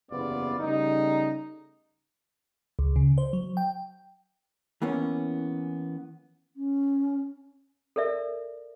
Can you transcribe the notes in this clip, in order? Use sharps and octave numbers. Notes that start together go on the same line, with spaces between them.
F#1 E2 C3 B3 F4 D5
C#3 G3 A3 D#4
C#2
C#3
C5
F#3
G5
E3 A#3 B3 C#4
C#4
A4 A#4 D5 E5